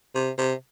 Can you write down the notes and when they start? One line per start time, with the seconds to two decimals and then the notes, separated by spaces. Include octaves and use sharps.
0.15 C3
0.38 C3